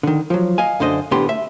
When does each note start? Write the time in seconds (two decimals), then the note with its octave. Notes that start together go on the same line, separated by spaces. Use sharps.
0.03 D3 D#3
0.30 F3 F#3
0.58 D#5 F5 G#5
0.80 F#2 D3 C5 D#5
1.11 B1 A2 D3 B3 G4 C6
1.29 A3 E5